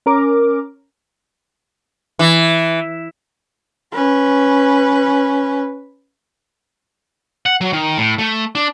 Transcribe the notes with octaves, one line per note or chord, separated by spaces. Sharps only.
C#4 A#4 D6
E3
C#4 B4
F#5
F#3
D#3
A2
A3
D4